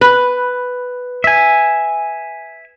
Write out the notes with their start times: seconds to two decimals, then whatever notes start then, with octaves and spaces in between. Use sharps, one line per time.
0.01 B4
1.24 E5 G#5